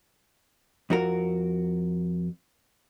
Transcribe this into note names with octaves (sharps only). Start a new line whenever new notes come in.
F2 F#4 A#4